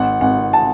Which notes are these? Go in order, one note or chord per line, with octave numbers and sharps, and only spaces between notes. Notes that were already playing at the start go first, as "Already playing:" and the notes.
Already playing: G#1 F#5
G#1 F#5
A5